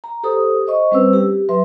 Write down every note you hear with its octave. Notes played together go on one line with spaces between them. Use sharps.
A#5
G4 A4 C5 D#6
C5 D#5 C#6
G3 C4 C#4 B4 C5 E6
G4
F#3 B4 E5 C6